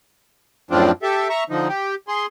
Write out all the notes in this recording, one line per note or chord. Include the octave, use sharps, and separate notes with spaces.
F#2 A2 F3 C4 D4 F4
G4 A4 E5
E5 A#5 C#6
D3 F3 D#4
G4
G#4 C6